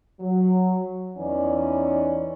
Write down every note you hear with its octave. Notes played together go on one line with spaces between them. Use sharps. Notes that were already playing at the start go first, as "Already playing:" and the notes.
F#3
E2 E3 C#4 D#4 D5